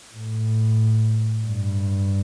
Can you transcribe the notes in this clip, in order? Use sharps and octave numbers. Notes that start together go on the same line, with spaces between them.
A2
G2